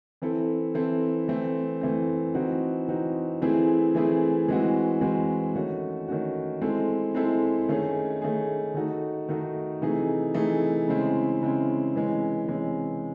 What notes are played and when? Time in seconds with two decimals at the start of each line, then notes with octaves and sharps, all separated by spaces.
0.22 E3 C4 E4 A4
0.74 E3 C4 E4 A4
1.28 E3 A3 C4
1.81 E3 A3 C4
2.35 E3 C4 D#4 F#4
2.88 E3 C4 D#4 F#4
3.42 E3 A3 C4 E4 G#4
3.95 E3 A3 C4 E4 G#4
4.48 E3 G#3 C4 F#4
5.01 E3 G#3 C4 F#4
5.55 D#3 A3 C#4 F#4
6.08 D#3 A3 C#4 F#4
6.61 G#3 C4 E4 A4
7.15 G#3 C4 E4 A4
7.69 D#3 A3 C#4 G#4
8.22 D#3 A3 C#4 G#4
8.74 D#3 A3 D#4 F#4 A4
9.28 D#3 A3 D#4 F#4 A4
9.81 C3 E3 A3 D#4 G#4
10.34 C3 E3 A3 D#4 G#4
10.88 C#3 G#3 C4 E4
11.41 C#3 G#3 C4 E4
11.95 C3 E3 G#3 C#4
12.48 C3 E3 G#3 C#4